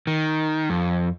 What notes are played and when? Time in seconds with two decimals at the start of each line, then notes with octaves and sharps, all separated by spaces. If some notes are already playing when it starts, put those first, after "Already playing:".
0.07 D#3
0.70 F2